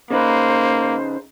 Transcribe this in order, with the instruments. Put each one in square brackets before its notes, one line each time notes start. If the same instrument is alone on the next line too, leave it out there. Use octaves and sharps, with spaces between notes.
[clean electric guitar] C#3 D#4 B4 [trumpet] A#3 [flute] C5